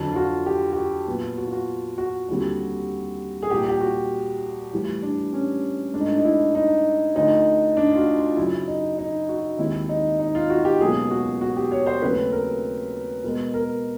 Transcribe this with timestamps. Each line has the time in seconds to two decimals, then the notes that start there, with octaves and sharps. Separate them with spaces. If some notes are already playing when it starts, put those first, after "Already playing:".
Already playing: F2 D3 F#3
0.12 F4
0.16 F#4
0.46 G4
0.72 G4
0.76 F#4
1.07 A#2 F#3 B3 F4
1.38 F#4
1.45 F4
1.52 F#4
1.98 F#4
2.29 D#2 D3 G3 C4
3.42 G#4
3.50 C2 A#2 F3 G4
3.69 G4
3.81 F#4
4.73 A2 E3 G3
5.02 D4
5.33 C#4
5.93 G#2 F3 A3 D4
6.01 D#4
6.08 D4
6.18 D#4
6.24 E4
6.55 D#4
7.15 D2 D3 F3 D#4
7.77 D4
7.91 F4
7.96 F#4
8.16 F4
8.36 F#2 C#3 F#3 E4
8.67 D#4
8.98 D#4
9.29 F#4
9.58 D#2 D#3 G#3 C4 E4
9.89 D#4
10.19 D#4
10.35 F4
10.50 F#4
10.65 G4
10.81 C#2 B2 F#3 A#3 G#4
11.11 F#4
11.41 F#4
11.56 G4
11.71 C#5
11.86 C5
12.02 D#2 C#3 F#3 A3 C4 B4
12.32 A#4
13.23 B2 G#3 B3 A#4
13.54 A#4